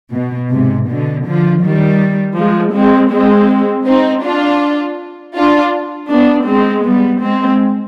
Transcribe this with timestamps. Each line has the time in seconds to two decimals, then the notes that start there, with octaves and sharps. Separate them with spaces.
0.13 B2
0.52 G#2 C3
0.88 B2 D3
1.26 D3 F3
1.63 D#3 G3
2.38 F3 G#3
2.75 G#3 C4
3.12 G#3 C4
3.87 C4 D#4
4.24 D4 F4
5.36 D4 F4
6.10 B3 D4
6.48 G#3 C4
6.85 G3 B3
7.22 G#3 C4